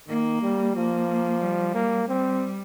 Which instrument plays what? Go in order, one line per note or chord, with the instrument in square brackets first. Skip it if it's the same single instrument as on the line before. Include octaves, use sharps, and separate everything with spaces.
[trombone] D#3 [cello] A#3
[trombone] G3
[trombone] F3 [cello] A#3
[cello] G3
[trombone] A#3
[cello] G3 [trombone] C4